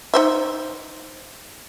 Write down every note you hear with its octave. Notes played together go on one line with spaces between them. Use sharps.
D#4 C5 E5